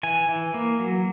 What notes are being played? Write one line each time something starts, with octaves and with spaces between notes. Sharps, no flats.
E3 G#5
E3
A#3
F#3